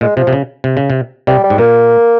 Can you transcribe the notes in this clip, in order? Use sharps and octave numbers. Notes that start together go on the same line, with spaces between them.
A#2 G#3
C3 F3
C3
C#3
C3
C#3
C3
C3 G3
G3
G#2
A#2 A#3